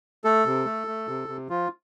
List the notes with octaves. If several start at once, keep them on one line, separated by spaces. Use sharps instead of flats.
A3 A4
C3
A3
A3
C3
C3
F3 F4